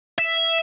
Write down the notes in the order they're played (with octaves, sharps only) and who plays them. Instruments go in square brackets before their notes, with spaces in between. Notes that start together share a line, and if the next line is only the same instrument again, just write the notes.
[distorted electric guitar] E5